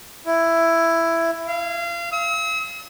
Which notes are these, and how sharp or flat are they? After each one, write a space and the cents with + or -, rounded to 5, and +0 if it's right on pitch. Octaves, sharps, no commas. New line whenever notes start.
E4 +10
F5 -30
E6 -45